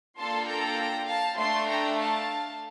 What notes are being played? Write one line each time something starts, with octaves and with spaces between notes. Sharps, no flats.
A#3 D4 F4 A4 A5 C6
G5 A#5
F5 A5
A3 D4 A4 A5 C6
G5 A#5
F5 A5